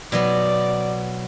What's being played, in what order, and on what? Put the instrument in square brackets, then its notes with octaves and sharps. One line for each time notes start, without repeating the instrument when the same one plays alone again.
[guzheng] B2 F#3 B3 [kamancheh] D5